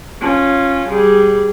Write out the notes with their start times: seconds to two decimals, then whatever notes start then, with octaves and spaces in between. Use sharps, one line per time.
0.21 C#4 F4
0.88 G3 G#4